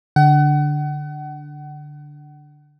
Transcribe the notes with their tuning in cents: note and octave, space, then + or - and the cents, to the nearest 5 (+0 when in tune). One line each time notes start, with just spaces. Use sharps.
D3 +0 F#5 +35